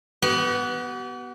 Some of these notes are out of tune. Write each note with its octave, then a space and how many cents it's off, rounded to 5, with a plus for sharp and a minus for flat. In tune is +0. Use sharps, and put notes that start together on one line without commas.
B3 -5 G4 -45